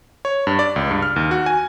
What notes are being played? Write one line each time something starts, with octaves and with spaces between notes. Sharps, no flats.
C#5
G2
D5
C#2
G2
F6
D#2
F#4
G#5